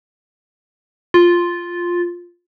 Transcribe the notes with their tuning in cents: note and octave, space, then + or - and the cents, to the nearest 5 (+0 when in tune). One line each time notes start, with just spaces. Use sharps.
F4 +0